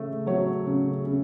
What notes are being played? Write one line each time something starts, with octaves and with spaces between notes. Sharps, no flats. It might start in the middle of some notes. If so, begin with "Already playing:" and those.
Already playing: C#3 A3
F#3 C#5
C#3
C#3